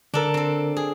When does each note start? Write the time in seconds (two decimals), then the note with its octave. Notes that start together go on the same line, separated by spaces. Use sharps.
0.14 D3 D4 A4 A#4
0.34 C4 A4
0.77 G#4